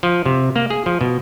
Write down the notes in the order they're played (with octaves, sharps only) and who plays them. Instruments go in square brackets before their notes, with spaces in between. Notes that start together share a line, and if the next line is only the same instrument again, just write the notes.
[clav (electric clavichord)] F3
C3
A#3
G#4
F3
B2